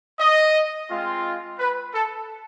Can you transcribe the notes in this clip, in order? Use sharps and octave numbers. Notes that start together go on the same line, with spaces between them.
D#5
G#3 C4 F4
B4
A4